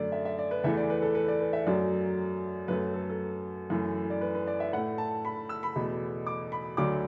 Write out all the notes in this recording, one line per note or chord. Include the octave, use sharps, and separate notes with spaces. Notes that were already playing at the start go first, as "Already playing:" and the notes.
Already playing: F#2 D3 A3 D5
E5
E5
D5
B4
E2 E3 A3 E5
D5
B4
A4
B4
D5
B4
E5
F#2 F#3 A3 D5
F#2 F#3 A3 B4
A4
A4
F#2 E3 A3
D5
B4
B4
D5
E5
A2 A3 F#5
A5
B5
E6
B5
E2 B2 A3
D6
B5
D2 D3 F#3 A3 D6